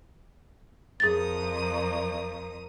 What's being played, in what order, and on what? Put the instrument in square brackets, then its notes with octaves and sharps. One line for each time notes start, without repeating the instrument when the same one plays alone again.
[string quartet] F2 A#4 D#6 [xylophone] G#4 A6